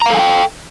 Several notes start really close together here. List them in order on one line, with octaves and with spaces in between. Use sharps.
A#5 F5 A4 G#5 G5